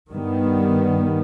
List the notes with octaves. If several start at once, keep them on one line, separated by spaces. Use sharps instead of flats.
G2 D#3 G3 B3